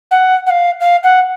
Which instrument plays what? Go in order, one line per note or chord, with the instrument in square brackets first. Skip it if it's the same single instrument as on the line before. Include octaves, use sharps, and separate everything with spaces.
[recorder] F#5
F#5
F5
F5
F#5